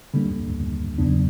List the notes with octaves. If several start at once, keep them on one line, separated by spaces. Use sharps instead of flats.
D3 G3 A#3 D4
E2 C#3 F#3 B3 D4